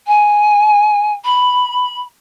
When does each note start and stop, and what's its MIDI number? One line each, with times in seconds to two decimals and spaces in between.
0.06 1.11 80
1.24 2.00 83